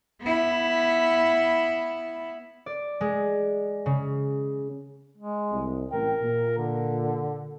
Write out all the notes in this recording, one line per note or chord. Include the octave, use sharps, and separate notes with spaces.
B3 E4
D5
G#3
C#3
G#3
C2
A1 A#4 G5
A#2
D3